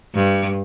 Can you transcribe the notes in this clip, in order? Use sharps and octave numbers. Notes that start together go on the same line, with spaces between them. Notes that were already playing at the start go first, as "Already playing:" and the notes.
G2